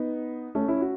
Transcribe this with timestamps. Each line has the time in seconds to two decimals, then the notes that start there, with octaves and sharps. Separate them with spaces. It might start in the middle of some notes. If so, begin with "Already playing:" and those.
Already playing: B3 D#4
0.55 A3 C#4
0.68 C#4 E4
0.81 F#4